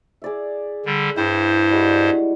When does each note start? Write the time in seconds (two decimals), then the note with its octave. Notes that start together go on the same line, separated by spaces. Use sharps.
0.22 G#4 D5 E5
0.86 D3 G3
1.16 G2 E4 C5 G5
1.71 G3 G#3 F#4